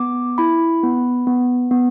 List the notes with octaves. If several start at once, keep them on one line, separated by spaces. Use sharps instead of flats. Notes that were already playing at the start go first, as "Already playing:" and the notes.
Already playing: B3 D6
E4 B5
B3
B3
B3